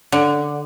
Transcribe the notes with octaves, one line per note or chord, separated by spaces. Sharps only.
D3